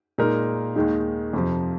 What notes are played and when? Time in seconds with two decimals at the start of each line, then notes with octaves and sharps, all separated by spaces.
0.18 A#2 G#3 D#4 A#4
0.76 D#2 D#3 G#3 D#4
1.33 F2 C3 F3